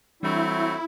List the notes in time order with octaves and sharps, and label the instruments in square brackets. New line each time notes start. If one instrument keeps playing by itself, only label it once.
[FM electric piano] E3 G3 D4 [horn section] F#3 A3 C4 [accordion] E4